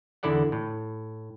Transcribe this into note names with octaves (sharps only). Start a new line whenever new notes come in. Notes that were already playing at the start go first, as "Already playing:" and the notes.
E2 D3 E4 A4 D5 F#5
A2